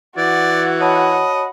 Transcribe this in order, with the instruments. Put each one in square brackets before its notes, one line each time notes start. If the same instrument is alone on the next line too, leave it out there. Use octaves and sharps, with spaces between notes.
[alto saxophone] E3 [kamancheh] F#4 F#5 [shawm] D5
[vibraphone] C#5 A5 B5 [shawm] D#5